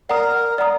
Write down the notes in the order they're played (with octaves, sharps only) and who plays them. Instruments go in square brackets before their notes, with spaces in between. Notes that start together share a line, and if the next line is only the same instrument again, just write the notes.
[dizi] A#4 [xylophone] D5 F#5 A#5 D#6
[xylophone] D5 F#5 A#5 D#6